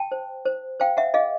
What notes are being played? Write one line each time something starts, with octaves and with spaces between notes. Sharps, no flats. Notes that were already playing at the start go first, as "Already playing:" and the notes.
Already playing: G5 A5
C5
C5
C5 F5 G5
E5 F#5
G#4 D#5 F5